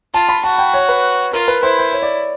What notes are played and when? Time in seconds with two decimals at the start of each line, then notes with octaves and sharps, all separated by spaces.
0.14 F4 A5
0.29 B5
0.44 F#4 A5
0.59 G5
0.74 C#5
0.89 B4
1.33 F4 A#4
1.48 B4
1.63 E4 C5
1.79 C5
1.93 C#5
2.02 D5